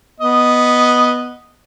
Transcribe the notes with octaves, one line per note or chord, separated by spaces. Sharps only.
B3 D#5